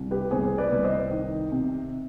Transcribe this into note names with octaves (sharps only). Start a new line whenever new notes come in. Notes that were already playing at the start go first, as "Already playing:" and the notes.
Already playing: C2
G4 B4
C2 G#4 C5
B4 D5
C2
C5 D#5
D#3
C3